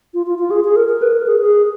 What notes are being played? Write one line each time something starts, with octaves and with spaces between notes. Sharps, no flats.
F4
F4
F4
G#4
G#4
A#4
A#4
B4
A#4
G#4
G#4